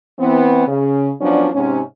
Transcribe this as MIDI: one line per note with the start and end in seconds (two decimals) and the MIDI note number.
0.18 0.66 52
0.18 0.66 59
0.18 0.66 60
0.67 1.09 49
1.21 1.49 53
1.21 1.49 54
1.21 1.49 59
1.21 1.49 61
1.21 1.49 62
1.53 1.80 44
1.53 1.80 48
1.53 1.80 61